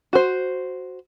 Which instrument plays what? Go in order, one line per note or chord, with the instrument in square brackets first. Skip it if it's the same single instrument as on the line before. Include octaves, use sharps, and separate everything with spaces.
[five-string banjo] F#4 C5